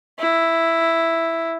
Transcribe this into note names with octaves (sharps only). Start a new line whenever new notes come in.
E4